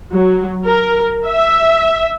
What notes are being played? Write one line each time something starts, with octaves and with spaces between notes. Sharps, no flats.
F#3
A#4
E5